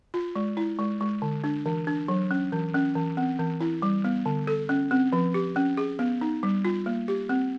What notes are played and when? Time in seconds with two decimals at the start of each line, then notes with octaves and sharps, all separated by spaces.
0.14 F4
0.35 G#3
0.57 E4
0.79 G#3
1.01 G#3
1.22 D3
1.44 D4
1.66 E3
1.87 D4
2.08 F#3
2.31 C#4
2.52 E3
2.74 C#4
2.95 E3
3.17 C4
3.39 E3
3.60 E4
3.82 G3
4.04 B3
4.26 D3
4.47 A4
4.69 C#4
4.91 C4
5.13 F3
5.34 G4
5.56 C#4
5.77 G#4
5.99 B3
6.21 D#4
6.43 G3
6.65 F4
6.86 A#3
7.08 G4
7.29 C4